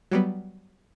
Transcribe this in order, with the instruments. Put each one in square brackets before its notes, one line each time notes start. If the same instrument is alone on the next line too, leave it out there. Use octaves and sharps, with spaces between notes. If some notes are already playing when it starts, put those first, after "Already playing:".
[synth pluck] F#3 G3 B3